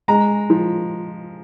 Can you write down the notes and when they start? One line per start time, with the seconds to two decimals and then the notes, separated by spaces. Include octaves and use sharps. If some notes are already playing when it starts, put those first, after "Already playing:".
0.08 G#3 A#5
0.50 F3